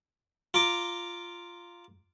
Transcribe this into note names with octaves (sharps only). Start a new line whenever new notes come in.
F4 A#5 D6